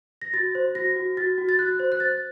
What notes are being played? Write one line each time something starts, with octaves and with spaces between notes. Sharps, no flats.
A#6
F#4 A6
C5
F#4 A#6
F#4
F#4 A6
F#4
A6
F#4 F#6
C5
F#6
C5 A6